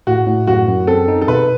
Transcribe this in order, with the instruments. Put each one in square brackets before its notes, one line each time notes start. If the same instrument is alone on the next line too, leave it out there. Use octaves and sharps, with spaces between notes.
[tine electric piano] A2 [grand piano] F#4
[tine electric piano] A2
[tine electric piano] F#2 [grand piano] F#4
[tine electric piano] F#2
[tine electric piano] C4 [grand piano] A4
[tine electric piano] D#4
[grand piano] A4
[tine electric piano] B2 [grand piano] B4